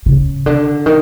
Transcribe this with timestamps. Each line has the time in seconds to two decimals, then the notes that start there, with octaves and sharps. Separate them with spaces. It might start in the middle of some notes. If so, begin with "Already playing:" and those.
0.06 C#3
0.46 D3
0.86 D#3